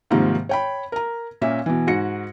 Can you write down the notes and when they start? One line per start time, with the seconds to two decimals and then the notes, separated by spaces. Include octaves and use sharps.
0.11 G#2 C3 D#3 F3 G3 A#3
0.49 C#5 G5 B5
0.92 A#4 A#5
1.42 A#2 A#3 C#4 E5
1.66 B2 E3
1.87 G#2 F#4 A#6 C#7